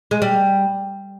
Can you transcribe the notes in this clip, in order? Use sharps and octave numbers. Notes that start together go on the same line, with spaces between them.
G#3
G3